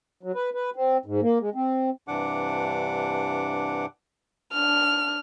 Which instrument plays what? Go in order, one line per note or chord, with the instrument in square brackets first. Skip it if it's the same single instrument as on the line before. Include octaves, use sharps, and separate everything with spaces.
[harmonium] F#3
B4
B4
C4
G#2
A#3
G#3
C4
[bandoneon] G2 C3 E3 D4 F#5 D6
[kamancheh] D4 F6